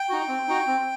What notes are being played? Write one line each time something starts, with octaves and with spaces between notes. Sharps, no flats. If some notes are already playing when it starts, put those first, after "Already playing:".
Already playing: G5
D#4 F#4
C4
D#4 F#4
C4